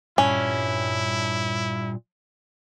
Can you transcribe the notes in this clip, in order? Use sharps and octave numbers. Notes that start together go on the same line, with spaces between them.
G2 A#2 C#4 E4